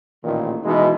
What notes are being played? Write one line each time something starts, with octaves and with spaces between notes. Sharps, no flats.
A1 A#2 D#3
B2 E3 G#3 D#4 F#4